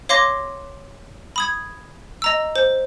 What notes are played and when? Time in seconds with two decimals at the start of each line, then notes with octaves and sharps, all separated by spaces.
0.09 C#5 F5 C6 D6 A#6
1.36 B5 D#6 G#6
2.22 D#5 A#5 E6
2.56 C5